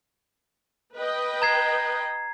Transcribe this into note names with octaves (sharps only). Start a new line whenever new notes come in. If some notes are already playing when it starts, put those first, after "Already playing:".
B4 D#5 G5
A#5 G#6 C7